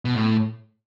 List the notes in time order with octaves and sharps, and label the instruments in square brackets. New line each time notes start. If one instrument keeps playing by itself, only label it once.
[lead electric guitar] B2
A2